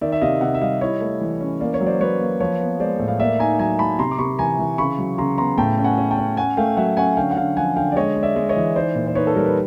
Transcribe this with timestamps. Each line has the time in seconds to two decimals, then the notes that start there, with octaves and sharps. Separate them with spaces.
0.01 D#3 D5 E5
0.12 E5
0.22 C3 D#5 F5
0.41 C3 E5 F#5
0.54 E5
0.61 G3 D#5 F5
0.81 E4 C#5 D#5
1.01 A3
1.21 E3
1.41 C#4
1.61 A#3 D5
1.74 C#5
1.81 F#3
1.86 C5 D5
2.00 F#3 B4 C#5
2.20 A#3
2.40 F3 B4 C#5
2.60 B3
2.80 G#3 C5 D5
2.99 A2
3.08 F5
3.20 A#3 D5 E5
3.39 D#4 G#5 A#5
3.59 F#3 G#5 A#5
3.79 F#3 A5 B5
3.99 C3 A#5 C6
4.11 D6
4.18 C3 B5 C#6
4.39 E3 G#5 A#5
4.59 E3
4.78 C#3 B5 C#6
4.98 F#3
5.18 C#3 A#5 C6
5.38 B3 A#5 C6
5.58 A2 G5 A5
5.78 C#4
5.84 F#5 G#5
5.98 C#4
6.11 G5 A5
6.18 C#4
6.37 C#4 F#5 G#5
6.57 A3 F5 G5
6.77 F#3 E5 F#5
6.97 C#4 F#5 G#5
7.17 D3 F5 G5
7.31 F#5
7.37 D3 F5 G5
7.57 F3 F#5 G#5
7.76 D3 F5 G5
7.92 D5
7.96 G#3 C#5 D#5
8.16 G#3
8.23 D5 E5
8.36 G#3
8.49 C#5 D#5
8.56 E3
8.76 D#4 C5 D5
8.95 A#2
9.07 C5
9.15 D#4 B4 C#5
9.27 A4
9.35 G3 A#4
9.46 B4